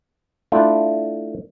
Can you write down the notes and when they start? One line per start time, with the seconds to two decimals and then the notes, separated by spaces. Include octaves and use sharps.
0.52 A3 D4 E4 F4